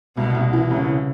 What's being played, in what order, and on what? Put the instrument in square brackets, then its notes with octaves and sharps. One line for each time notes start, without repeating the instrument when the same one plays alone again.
[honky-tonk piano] C2 [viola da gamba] B2
[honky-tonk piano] C2
E3
[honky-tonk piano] C2 [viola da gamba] C#3